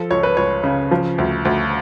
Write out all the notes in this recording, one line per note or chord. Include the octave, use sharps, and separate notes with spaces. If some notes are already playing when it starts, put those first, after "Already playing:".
Already playing: F3 A4
C#2 C#5
B4
C#2 C#5
C#3
F3
D2
D2